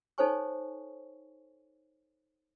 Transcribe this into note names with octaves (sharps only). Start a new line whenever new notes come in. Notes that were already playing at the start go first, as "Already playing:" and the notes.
D#4 A4 C5 C#5 G#5 C#6